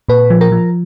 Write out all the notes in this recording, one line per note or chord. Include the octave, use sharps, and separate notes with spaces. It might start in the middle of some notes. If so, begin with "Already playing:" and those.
A#2 B4 B5
F3
A#4 A#5
F3